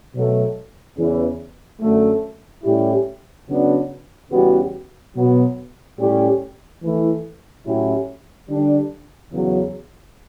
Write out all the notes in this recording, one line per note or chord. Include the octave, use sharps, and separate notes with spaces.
B2 F#3 A3
E2 C#3 E3
F#2 D3 F#3 A3
A2 G3 C#4 E4 G4
C#3 F#3 B3 D4 F#4
E2 C#3 G3 B3 F#4
B2 F#3 B3 F#4
A2 G3 C#4 G4
E3 A3 E4
A2 F#3 C#4 E4 G4
D3 G3 D4
E2 C#3 F#3